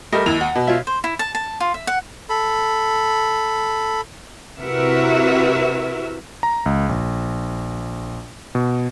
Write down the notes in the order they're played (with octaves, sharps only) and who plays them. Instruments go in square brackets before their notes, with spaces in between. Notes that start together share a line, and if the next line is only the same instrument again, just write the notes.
[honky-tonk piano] G3 A3 D#5 [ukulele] A#4
[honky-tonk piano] D#2 F7 [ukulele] E4
[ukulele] F#5
[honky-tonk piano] B2
[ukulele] F4 C#5 E5
[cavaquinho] C5
E4
A5
A5
F4
E5
F#5
[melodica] A4 B5
[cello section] C3 E4 F#4 A#4 B4 E5
[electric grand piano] A#5
C#2
A#1
B2